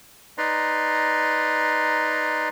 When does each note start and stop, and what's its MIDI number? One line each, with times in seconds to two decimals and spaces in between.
0.38 2.49 63
0.38 2.49 71
0.38 2.49 74
0.38 2.49 82
0.38 2.49 84